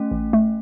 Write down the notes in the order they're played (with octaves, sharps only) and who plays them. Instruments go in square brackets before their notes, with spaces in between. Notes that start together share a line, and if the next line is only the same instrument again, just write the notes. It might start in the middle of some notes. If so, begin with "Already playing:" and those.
Already playing: [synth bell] A3 C#4
[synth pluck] A1
A3